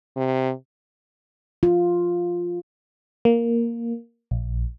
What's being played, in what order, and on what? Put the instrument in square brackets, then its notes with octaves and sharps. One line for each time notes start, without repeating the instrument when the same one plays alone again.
[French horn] C3
[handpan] F4
[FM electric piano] A#3
A#1